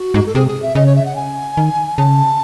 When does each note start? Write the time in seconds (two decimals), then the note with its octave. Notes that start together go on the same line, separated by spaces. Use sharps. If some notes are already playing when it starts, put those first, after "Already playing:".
Already playing: F#4
0.14 G#2
0.26 A4
0.35 C3 G#4
0.48 G#4
0.62 E5
0.75 C#3 D#5
0.86 C#5
0.96 E5
1.06 F#5
1.16 G#5
1.57 D#3
1.98 C#3 A5